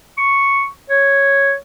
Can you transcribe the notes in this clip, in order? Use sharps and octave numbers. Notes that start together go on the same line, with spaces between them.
C#6
C#5